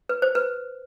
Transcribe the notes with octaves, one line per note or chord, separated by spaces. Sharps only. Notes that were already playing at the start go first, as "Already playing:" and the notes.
B4
C5
B4